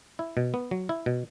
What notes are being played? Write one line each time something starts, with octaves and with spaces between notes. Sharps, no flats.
E4
B2
B3
F#3
E4
B2